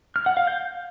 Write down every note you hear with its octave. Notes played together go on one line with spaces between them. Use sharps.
F6
F#5
F5
G6